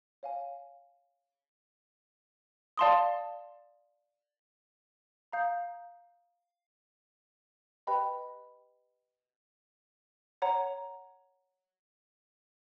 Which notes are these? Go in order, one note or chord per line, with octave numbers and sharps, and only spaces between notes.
C#5 F5 G#5
D5 F5 A5 C6 D#6
F5 A#5 D#6 G6
G4 B4 D#5 G5 B5
C#5 F#5 A#5